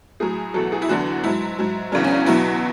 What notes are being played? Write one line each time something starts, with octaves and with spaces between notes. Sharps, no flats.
A2 F#3 G#4
E2 B2 F#3 A4
G#4
E4
E2 D3 F#3 F#4
G#2 F#3 E4
G#2 F#3
E2 C#3 F#3 D4
C#4
E2 B2 F#3 E4